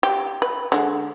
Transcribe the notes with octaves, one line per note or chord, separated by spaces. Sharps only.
G4
B4
D3 G#3